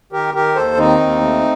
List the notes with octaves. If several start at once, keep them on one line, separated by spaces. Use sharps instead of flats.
D#3 G4 A#4
D#3 G4 A#4
D#2 A4 C5
D#3 C4 D#4
D#2
A3